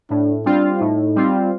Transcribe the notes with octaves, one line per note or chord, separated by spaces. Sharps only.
A2 D4
G3 C4 D4 F4
A2 D#4
G3 C4 F4